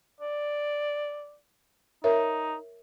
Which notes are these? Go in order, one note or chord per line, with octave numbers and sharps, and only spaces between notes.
D5
D#4 A#4 C#5 E5